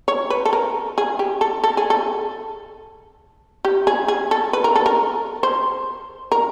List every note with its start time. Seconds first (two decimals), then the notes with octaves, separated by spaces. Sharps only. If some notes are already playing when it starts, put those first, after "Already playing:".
0.08 C#5
0.30 B4
0.45 A4
0.53 A#4
0.98 G#4
1.19 G4
1.41 A4
1.64 A4
1.77 G#4
1.90 A4
3.65 G4
3.87 G#4
4.08 G#4
4.31 A4
4.53 B4
4.64 A#4
4.75 A4
4.86 A#4
5.43 C5
6.32 A#4